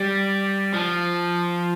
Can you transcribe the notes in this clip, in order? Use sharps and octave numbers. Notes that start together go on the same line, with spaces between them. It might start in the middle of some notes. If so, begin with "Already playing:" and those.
Already playing: G3
F3